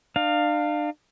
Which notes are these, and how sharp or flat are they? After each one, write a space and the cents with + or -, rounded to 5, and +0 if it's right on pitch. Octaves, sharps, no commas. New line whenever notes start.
D4 +35 F5 +0